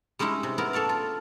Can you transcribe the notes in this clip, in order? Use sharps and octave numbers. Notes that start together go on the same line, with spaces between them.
G3 G#3 C#4 D#4 E4
C3
B3 E4 A#4
A4 C#5 D5 F5
F4